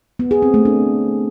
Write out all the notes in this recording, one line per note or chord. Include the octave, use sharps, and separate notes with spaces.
B3
G#4
C4
A3
D4